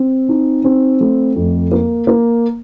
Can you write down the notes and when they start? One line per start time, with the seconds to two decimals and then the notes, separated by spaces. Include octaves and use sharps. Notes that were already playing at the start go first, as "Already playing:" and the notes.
Already playing: C4
0.29 D#4
0.64 C4
1.01 A3
1.36 F2
1.72 A#3
2.07 A#3